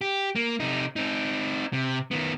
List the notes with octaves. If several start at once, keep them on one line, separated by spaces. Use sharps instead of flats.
G4
A#3
C3 D#4
C4 D#4
C3
D#3 B3